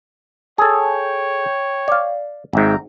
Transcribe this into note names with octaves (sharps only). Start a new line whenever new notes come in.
G#4 A4 C#5 G5
D5 F5
G#1 G#2 E5 G5 A#5